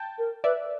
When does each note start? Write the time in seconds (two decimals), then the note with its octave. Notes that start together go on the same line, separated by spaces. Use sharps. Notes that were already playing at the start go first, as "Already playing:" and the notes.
Already playing: G5 A5
0.18 A#4
0.44 B4 D5 E5